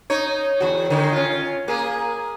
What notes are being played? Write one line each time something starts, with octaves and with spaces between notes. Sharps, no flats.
D#4 C#5
E2 F#4
D3 D#3 G#3
C#4 F4
A#3 G#4